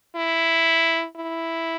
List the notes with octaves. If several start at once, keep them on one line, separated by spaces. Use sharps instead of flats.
E4
E4